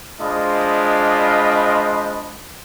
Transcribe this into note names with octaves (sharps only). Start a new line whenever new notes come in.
G#3 D4 F4 C5 D#5 B5